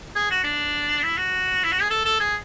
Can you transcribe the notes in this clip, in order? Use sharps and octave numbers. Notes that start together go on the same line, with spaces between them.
G#4
F#4
D4
E4
F#4
E4
F#4
G#4
A4
A4
G#4